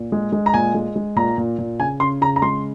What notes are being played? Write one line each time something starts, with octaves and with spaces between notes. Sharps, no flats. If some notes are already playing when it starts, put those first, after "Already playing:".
Already playing: A#2
G#3
G#3
A#5
A#2 G#5
G#3
G#3
A#2 A#5
A#2
A#2
C#3 G#5
C#3 C6
C#3 A#5
A#5
G#3 C6